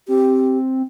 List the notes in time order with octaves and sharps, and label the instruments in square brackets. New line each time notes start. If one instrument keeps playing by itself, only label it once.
[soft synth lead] C4 [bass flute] G4